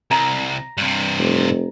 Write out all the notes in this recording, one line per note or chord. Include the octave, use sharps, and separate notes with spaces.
C2 A#5
G2 C3
F1